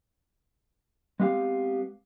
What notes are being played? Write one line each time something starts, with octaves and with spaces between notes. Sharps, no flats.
G#3 B3 C4 G4 F5